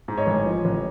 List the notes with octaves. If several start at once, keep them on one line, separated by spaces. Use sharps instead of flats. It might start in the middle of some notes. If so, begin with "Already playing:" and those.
G#2
C#5 D#5
A1
F3
A1